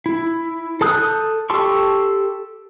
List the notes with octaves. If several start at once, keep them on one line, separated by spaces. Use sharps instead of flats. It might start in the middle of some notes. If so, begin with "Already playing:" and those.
E4
A4 A5 D#6 F#6 G6
G4 A4 A5 C6 C#6